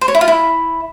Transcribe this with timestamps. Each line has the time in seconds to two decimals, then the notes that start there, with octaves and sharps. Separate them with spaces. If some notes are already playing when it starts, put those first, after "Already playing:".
0.01 C5
0.08 C#5
0.15 E4
0.21 F4
0.28 E4